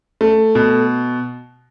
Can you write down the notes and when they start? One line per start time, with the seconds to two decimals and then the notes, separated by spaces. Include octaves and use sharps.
0.21 A3
0.55 B2